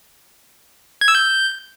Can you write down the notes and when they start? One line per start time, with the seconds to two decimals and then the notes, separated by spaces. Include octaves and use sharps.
1.01 G#6
1.08 E6
1.15 G6